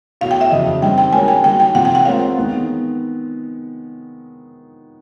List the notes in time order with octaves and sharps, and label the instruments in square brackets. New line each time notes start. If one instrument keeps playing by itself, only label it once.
[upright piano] E2 B2 F#3 A3 [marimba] F5
[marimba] G5
E5
[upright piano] F2 C#3 F#3 [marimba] D#5
[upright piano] G2 D#3 G3 C4 [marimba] G5
[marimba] G5
[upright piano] G#3 C#4 F#4 A#4 C#5 [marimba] G#5
[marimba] G5
[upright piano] D3 G3 A#3 D#4 F#4 [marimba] G5
[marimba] G5
[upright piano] C3 F3 A3 C4 F4 [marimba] F#5
[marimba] G5
F#5
[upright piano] G#3 C4 F4 A#4 C#5 [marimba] F5
[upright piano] D#3 G#3 B3